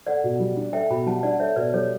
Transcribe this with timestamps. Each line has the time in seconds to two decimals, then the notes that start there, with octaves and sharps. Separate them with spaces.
0.06 A4 D5 F#5
0.24 B2
0.40 G3
0.56 D4
0.73 A4 E5 G5
0.90 B2 G5 B5
1.06 G3 F#5 A5
1.23 D4 D5 F#5
1.40 A4 C#5 E5
1.56 B2 B4 D5
1.73 G3 A4 C#5